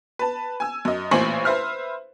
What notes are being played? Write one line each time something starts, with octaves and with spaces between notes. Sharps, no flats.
B4 A5
G#5 E6
F#2 D#5
A1 A#2 C5 G#5 C#6 F#7
B4 C5 E5 F6